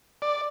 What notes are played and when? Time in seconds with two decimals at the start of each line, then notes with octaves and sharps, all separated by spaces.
0.22 D5